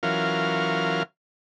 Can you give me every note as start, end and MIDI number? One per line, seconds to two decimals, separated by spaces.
0.03 1.03 52
0.03 1.03 54
0.03 1.03 61
0.03 1.03 65
0.03 1.03 70
0.03 1.03 77